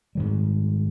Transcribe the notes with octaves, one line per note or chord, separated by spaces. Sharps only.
G#2 D#3 G3